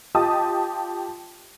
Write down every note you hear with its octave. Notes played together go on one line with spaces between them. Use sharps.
F4 G4 D#5 A5 D#6